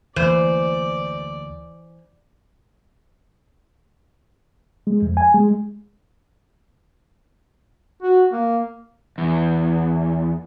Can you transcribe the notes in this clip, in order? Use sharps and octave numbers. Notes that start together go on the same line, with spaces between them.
D2 E3 A3 A#3 C5 D5
G#3
F2
G#5
G#3
F#4
A#3
E2